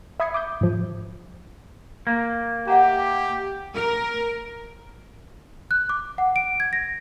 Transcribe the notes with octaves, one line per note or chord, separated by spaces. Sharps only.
E5 B5 D#6 G#6 C7 C#7
D6 D#6 G6
G#2 F3
A#3
G4 E5 F#5 A#5
A#4
F#6
D6
F#5
D7
G#6
A#6